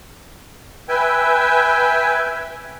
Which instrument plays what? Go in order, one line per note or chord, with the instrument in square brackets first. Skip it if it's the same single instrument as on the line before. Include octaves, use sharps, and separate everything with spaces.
[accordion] B4 E5 G5 G#5